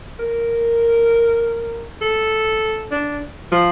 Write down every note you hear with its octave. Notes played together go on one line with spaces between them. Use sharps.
A#4
A4
D4
F3